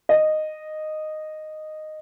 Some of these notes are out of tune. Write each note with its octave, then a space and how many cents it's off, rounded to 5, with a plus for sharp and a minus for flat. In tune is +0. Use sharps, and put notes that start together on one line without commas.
D#5 -10